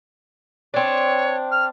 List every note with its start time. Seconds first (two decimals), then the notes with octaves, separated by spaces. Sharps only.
0.74 C4 D4 C#5
1.52 F6